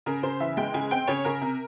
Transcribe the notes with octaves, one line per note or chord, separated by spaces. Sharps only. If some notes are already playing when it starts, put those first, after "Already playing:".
C#3 A#4
C#3 C5
E3 E5
G#3 G5
C#3 G#5
C4 G5
C#3 C#5
C#3 A#4
C3